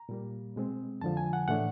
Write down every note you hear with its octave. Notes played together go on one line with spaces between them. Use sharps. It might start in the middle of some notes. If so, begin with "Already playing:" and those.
Already playing: A#5
A#2 G3 A#3
B2 G#3 C4
F2 D3 F3 A5
G#5
F#5
A2 E3 A3 D4 F#5